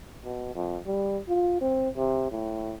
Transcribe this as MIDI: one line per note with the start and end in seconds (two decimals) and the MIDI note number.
0.24 0.51 47
0.55 0.78 41
0.86 1.19 55
1.28 1.57 65
1.61 1.89 60
1.96 2.31 48
2.31 2.75 45